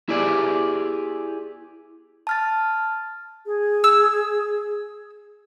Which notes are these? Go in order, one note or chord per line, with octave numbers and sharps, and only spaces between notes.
E4 G4 G#4 D5
A5 F6 A6
G#4
E6